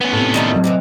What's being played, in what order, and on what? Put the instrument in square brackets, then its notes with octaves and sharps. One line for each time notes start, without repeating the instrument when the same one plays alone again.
[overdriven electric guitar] B3 C#4
[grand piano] A2 C3
[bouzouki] D#3 G3 A3
[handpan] F#3 C4 F#4
[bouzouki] C3 D#3 E3